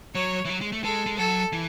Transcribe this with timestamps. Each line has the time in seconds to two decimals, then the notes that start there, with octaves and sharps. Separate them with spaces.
0.14 F#3 C#5
0.45 E3
0.50 F#3
0.61 G#3
0.72 A3
0.83 G#3 A4
1.06 G#3
1.18 F#3 A4
1.52 E3